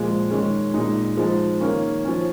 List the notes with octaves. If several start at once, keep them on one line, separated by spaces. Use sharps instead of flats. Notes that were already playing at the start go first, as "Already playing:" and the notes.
Already playing: A#2 F3 G#3
D#3 G#3 C#4
A#2 G#3 D#4
F3 G#3 D#4
D#3 A#3 C#4
F3 C#4